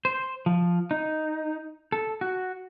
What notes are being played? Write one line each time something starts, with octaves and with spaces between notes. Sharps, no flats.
C5
F3
D#4
A4
F#4